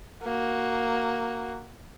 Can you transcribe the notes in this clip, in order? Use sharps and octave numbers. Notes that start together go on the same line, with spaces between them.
A#3 F#4